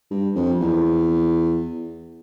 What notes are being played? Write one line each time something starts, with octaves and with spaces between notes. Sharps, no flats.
G2
F2
E2